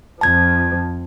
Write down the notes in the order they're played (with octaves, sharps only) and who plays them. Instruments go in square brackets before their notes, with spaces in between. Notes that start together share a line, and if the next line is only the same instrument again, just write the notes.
[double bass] F2 F3 [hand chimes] A5 G#6